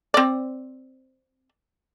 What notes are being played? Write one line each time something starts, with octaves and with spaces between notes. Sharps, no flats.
C4 D5